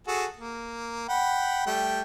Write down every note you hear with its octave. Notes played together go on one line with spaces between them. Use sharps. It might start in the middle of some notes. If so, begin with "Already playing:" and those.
F#4 G#4 A4
A#3
F#5 G5 B5
G3 A3 G5